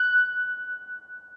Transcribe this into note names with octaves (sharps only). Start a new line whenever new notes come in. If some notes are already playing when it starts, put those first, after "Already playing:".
Already playing: F#6